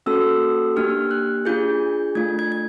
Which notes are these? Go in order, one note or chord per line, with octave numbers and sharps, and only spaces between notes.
A#3 C#4 F#4 A4 E6
A#3 D4 G4 F6
F#6
D4 F4 G#4 G6
A3 D4 F4 G#6
G#6
G#6